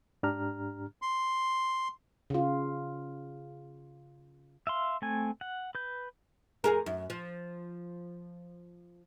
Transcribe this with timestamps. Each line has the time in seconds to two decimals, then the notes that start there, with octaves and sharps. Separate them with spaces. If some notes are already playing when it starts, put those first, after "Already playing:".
0.23 G#2 D4 G4 A#5 F6
1.02 C6
2.30 C#3 F4
4.67 E5 F5 C6
5.02 A3 C4 G#5
5.41 F#5
5.75 B4 G6
6.64 F2 G#4 A#4
6.86 F#2
7.10 F3